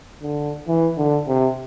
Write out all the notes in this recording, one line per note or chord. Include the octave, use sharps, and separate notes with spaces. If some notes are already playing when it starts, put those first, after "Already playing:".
D3
E3
D3
C3